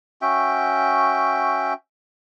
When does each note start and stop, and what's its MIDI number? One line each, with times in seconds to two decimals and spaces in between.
0.22 1.73 61
0.22 1.73 66
0.22 1.73 76
0.22 1.73 79